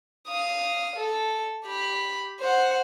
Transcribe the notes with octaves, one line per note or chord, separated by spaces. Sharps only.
F5 D#6
A4
G4 B5
C5 F#5